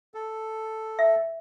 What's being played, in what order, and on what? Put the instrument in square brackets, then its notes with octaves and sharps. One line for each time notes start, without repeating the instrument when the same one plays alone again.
[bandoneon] A4
[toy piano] E5